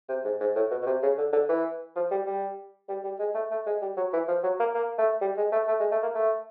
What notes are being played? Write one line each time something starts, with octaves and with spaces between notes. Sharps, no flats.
C3
G#2
G#2
A2
B2
B2
C3
C#3
D3
D3
E3
F3
G3
G3
G3
G3
G#3
A3
A3
G#3
G3
F#3
E3
F3
F#3
A#3
A#3
A3
G3
G#3
A3
A3
G#3
A3
A#3
A3